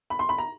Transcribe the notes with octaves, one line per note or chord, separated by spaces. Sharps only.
B5
C6
B5
A#5